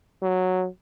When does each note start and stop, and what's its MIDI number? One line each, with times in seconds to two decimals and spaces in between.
0.22 0.67 54